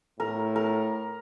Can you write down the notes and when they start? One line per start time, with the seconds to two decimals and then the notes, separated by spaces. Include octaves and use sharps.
0.20 A2 A#4
0.56 A#4